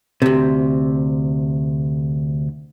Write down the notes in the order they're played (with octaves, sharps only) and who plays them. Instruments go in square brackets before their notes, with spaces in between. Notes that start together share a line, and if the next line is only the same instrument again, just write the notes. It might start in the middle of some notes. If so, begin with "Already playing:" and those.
[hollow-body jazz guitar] D2 C3